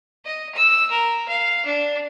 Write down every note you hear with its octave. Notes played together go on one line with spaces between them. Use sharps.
D#5
E6
A#4
F5
D4